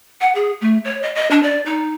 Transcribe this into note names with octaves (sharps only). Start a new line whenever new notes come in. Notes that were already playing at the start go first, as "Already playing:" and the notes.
F#5
G#4
A3
C#5
D#5
D#5
D4
D5
D#4